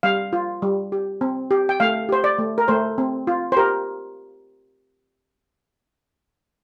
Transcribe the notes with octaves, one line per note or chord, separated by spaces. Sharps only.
G3 F5
F4
G3
G4
C4
G4
G5
A3 F5
G4 C5
D5
A3
A#4
A3 C5
C4
F4
C5
G4 A#4